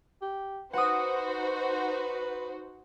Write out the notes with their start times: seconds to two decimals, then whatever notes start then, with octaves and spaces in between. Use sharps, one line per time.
0.22 G4
0.73 D#4 F#4 B4 C5 F#5 D#6